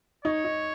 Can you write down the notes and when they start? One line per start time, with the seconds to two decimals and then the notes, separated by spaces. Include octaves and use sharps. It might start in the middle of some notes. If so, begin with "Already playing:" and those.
0.25 D#4 C#5
0.45 D#4